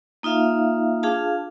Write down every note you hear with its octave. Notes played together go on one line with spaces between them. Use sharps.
A#3 D#4 F4 E5 F5
D4 F4 G#4 F5 A5